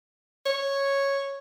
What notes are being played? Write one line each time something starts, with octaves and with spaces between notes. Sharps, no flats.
C#5